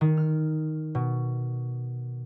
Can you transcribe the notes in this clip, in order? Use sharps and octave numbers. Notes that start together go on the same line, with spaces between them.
D#3
F6
B2